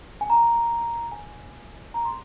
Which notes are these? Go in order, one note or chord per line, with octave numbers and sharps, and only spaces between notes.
G#5
A#5
G#5
A#5
C6